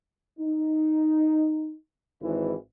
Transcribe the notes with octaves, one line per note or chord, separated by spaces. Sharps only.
D#4
G#1 E3